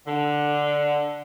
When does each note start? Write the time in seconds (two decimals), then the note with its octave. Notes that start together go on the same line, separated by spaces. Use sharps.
0.06 D3